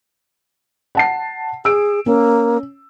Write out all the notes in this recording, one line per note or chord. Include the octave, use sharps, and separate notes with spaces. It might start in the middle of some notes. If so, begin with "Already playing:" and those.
F#5 A5 C7
G#4 E6 D7
A#3 C#4